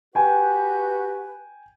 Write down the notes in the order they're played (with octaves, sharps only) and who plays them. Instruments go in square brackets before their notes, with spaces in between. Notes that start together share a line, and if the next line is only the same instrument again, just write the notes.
[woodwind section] F#4 G4 B4 [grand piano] G5 G#5